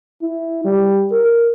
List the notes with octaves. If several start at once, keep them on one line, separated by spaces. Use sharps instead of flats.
E4
G3
A#4